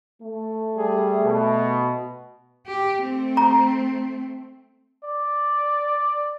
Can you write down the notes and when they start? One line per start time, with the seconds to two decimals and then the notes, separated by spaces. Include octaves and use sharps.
0.22 A3
0.77 G3 G#4
1.23 B2
2.67 G4
3.04 A3 C4
3.37 A#5
5.05 D5